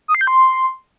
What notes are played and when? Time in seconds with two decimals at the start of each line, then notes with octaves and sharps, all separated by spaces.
0.08 D#6
0.15 C7
0.21 G6
0.27 C6